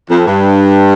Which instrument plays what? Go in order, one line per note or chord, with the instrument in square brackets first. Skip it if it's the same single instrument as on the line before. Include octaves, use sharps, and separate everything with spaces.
[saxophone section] F2
G2